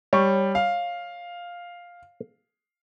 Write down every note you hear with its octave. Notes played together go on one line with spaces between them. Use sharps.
G3 C#5
F5